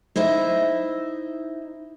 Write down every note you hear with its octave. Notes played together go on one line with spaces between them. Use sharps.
D#4 E4 C5 D#5 E5